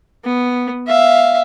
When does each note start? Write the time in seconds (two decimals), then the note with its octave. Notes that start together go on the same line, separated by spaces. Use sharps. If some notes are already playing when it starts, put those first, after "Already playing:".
0.25 B3
0.87 E5 F5